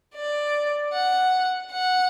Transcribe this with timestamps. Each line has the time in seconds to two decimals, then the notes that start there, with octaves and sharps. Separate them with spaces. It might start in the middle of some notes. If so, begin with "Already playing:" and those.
0.15 D5
0.93 F#5
1.72 F#5